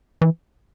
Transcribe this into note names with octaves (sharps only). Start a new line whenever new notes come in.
E3